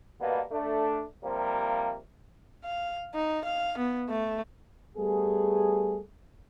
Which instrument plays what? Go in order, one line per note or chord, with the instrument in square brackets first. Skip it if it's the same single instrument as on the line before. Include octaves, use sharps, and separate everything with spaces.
[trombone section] G2 B2 A#3 B3
A3 D4
C3 F3 G3 A#3
[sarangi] F5
D#4
F5
B3
A3
[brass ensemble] G3 A3 B3 G#4